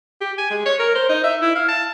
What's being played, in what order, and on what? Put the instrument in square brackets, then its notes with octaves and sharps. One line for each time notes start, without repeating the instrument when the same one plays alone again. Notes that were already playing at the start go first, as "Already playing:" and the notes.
[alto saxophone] G4
G#5
G#3
C#5
A#4
C5
D#4
E5
E4
F5
A5